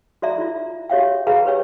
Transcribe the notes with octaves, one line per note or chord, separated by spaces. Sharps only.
F#4 D5 E5 A#5
E4 F4
F#4 G4 C#5 E5 F5 G5
F#4 G#4 B4 F5 G5 A#5
G4 B4 C#5 G5